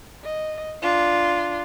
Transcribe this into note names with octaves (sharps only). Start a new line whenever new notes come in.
D#5
D4 F4